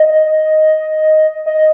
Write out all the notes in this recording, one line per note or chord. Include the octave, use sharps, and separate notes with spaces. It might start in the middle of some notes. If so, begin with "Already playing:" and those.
Already playing: D#5
D#5